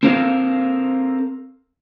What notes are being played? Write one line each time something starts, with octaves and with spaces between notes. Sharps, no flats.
C4 A4 A#4 C5 F5